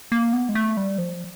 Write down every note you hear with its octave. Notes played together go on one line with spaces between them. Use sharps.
A#3
B3
G#3
A3
G3
F3